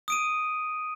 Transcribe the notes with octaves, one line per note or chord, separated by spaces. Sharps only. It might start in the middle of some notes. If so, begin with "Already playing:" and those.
D#6 D7 D#7